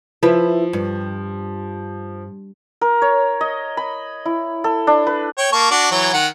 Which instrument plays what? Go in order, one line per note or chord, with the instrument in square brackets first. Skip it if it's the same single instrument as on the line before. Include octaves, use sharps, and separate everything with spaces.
[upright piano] F3 [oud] E4 B4
[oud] G2
[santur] A#4
C#5
D#5
B5
E4
A4
D4
B4
[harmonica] C#5 G5
A#3 A5 C#6
D4 F#4 D5
E3 F#3 C#5
D#3 F#5